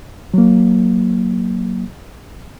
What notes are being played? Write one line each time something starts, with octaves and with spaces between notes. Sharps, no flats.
F#3 A#3